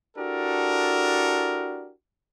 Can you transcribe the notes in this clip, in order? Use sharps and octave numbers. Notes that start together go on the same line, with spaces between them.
D4 E4 F#4 G4 A4 A#4